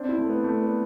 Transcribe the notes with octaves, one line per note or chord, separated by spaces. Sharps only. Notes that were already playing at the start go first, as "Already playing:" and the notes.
Already playing: C4 D4
E4
A3
B3
A3
B3